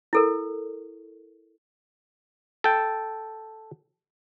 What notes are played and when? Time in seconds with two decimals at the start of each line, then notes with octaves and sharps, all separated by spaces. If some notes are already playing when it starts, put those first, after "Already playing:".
0.13 E4 A4 A#4
2.64 A4 G5